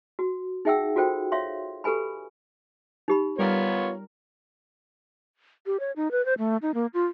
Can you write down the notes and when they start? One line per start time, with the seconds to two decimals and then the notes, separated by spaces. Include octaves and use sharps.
0.19 F#4
0.65 D#4 G#4 E5 F#5 G5 E6
0.96 F4 F#4 A4 C5 G5
1.32 C#5 E5 F5 C6
1.84 G4 A4 B4 G#5 B5
3.08 D#4 G4 B5
3.38 G3 B3 F4 A#4 C#5
5.66 G4
5.80 C#5
5.96 D#4
6.11 B4
6.25 C5
6.38 A3
6.62 D#4
6.74 A#3
6.94 F4